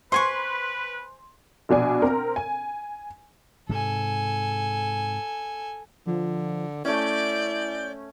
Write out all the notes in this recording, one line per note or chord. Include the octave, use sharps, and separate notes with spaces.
B4 C5 G#5 C6 C#6
A#1 B2 D4 G#5
C4 A#4
G#5
G#2 C3 A4 G#5
D3 F3
A3 C#4 E4 D5 G6